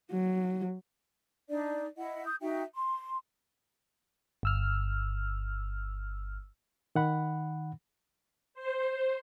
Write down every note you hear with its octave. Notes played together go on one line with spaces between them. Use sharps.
F#3
D4 D#4 D5
E4 D#5 F#5
D#6 G6
D#4 F#4 E5 G5
C6
G1 E6 F6
D#3 F#5 B5
C5